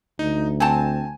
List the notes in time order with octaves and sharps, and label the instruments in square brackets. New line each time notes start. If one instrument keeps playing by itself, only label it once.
[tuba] D2 [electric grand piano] D#4
[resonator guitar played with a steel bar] C4 A5 [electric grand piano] G#5